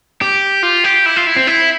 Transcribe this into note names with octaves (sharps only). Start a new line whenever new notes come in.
G4
F4
G4
E4
F4
E4
C4
E4